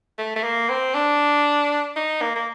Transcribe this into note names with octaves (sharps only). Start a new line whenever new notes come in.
A3
A3
A#3
C4
D4
D#4
A#3
A#3